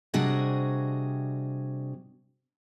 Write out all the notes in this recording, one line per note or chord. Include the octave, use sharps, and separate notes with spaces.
C3 G3 D4 F#4 G#4 D#5